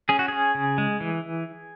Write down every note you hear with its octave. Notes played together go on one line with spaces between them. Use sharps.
C#4 G#4
F#4
C#4 G#4
C#3
G#3
E3